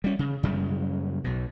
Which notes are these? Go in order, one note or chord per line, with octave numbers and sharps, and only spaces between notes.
G3 C#4
C#3
F#2 C#3 G3 G#3
B1 B2